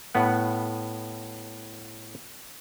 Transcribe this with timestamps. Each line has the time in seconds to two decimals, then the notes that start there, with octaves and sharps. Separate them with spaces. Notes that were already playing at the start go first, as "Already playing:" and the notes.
0.15 A2 B3 F#5